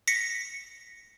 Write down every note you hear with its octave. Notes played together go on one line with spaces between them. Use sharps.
A#6 B6 C#7